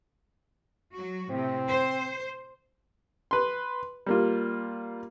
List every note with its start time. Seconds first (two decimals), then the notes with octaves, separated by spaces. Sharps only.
0.92 F#3 F#4
1.30 A2 C3 C4
1.68 C5
3.31 B4 C6
4.06 G3 A#3 F4